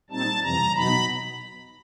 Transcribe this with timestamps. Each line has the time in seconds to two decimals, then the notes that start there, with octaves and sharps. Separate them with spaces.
0.10 A#2 G3 C4 D#4 A5
0.42 F2 C3 E3 G3 A#5
0.76 B2 F#3 B3 D#4 B5